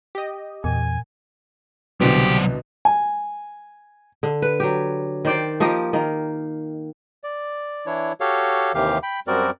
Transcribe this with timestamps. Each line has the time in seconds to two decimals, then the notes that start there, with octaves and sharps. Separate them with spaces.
0.15 G4 D#5
0.64 E2 A#2 G#5
2.01 C2 B2 D3 F#3 G4 C5 G5
2.85 G#5
4.23 D3
4.42 B4
4.60 F#3 G4
5.25 D#3 C5 D5 G5
5.60 F3 A#3 G4 D#5
5.93 D#3 A#3
7.24 D5
7.86 E3 D4 E4 C#5
8.20 F#4 G4 A4 C#5 F5
8.74 D#2 C3 D#3 E3 G4 F5
9.03 G5 B5
9.27 F#2 G3 C4 F#4 A#4 D5